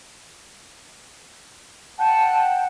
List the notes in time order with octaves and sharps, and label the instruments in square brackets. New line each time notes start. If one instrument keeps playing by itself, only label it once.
[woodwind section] F#5 G5 [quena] A5